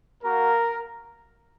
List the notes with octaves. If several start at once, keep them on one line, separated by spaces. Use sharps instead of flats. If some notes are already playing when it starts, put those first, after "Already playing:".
A#3 F#4 A#4